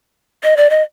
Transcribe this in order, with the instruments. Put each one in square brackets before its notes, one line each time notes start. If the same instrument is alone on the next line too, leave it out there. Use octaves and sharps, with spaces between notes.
[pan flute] D#5
D5
D#5